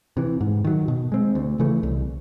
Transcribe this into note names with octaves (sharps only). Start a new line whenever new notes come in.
C3 E3
G#2
D#3 F#3
B2
G#3 C4
D2
C#3 E3 A3
C2